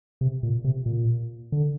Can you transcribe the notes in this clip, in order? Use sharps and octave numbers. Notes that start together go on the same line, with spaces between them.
C3
A#2
C3
A#2
D3